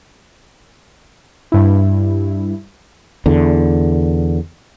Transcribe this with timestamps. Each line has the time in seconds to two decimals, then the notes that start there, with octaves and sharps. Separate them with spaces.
1.52 G2 E4
3.26 E2 D3